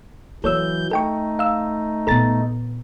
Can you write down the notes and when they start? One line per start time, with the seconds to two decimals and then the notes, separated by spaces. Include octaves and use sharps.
0.44 E3 F#3 A#3 A4 C#5 E6 G6
0.91 A3 D#4 A4 G5 C#6
1.39 F5 E6
2.07 A#2 B3 A4 A#5 A6